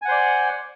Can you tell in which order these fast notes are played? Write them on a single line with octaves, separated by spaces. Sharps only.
G#5 F#5 C5 D5